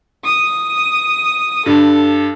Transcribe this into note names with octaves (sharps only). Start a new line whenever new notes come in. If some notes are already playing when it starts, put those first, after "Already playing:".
D#6
G2 A4